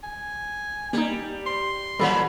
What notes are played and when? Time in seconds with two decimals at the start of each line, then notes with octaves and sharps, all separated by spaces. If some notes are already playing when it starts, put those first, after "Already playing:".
0.04 G#5
0.93 G3 A#3 D#4
1.46 C6
1.99 A#2 E3 F#3 G3 A4 B5